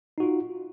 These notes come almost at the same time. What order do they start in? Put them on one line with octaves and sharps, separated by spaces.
D#4 F#4 F4